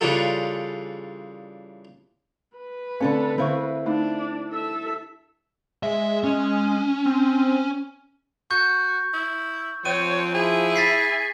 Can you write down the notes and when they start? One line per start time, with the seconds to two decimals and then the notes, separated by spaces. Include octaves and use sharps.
0.01 C#3 E3 G3 D4 F4 A4
2.57 B4
3.00 D3 A3 C4 C#4 A4 C#5
3.38 D3 C4 E4 F5 C#6
3.86 A3 D4 D#4
4.51 A4 E5
5.83 G#3 E5
6.24 C#4
7.06 C4
8.50 F#4 C#6 G6
9.13 E4
9.85 F3 C4 C#5 D#7
10.34 E4 G#4
10.76 A6 B6 C7